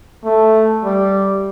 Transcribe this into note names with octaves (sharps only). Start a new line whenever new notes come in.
A3
G3